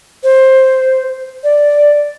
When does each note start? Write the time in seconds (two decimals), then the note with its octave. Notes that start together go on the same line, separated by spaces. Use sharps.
0.24 C5
1.44 D5